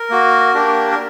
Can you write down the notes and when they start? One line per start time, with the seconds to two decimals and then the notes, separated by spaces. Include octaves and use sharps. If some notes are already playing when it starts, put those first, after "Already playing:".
Already playing: A#4
0.10 A#3 F#4
0.54 A#3 D4 G4
0.91 A#4